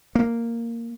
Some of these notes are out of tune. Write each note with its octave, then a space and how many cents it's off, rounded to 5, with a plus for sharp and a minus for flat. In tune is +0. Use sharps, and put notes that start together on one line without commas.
A#3 -5